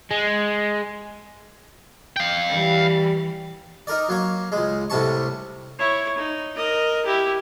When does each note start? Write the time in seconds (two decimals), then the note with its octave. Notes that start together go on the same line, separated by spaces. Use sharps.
0.11 G#3
2.16 F5 G5
2.50 E3 G3
3.87 D#4 A#4 D5
4.09 F#3 A#3 C#5
4.52 C#2 G#3
4.90 C2 A2 C3 A5 C#6
5.79 E4 C#5
6.18 D#4
6.56 A#4 D#5
7.05 E4 G4